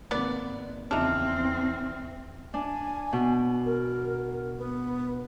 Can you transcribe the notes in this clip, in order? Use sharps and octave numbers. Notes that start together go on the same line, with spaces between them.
G#1 A#3 B3 B4 D5
E2 C#3 F3 C4 D4 D#4 E5 F6
D4 G#5
B2
A#4
B3